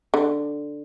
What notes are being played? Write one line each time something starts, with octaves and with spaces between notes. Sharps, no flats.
D3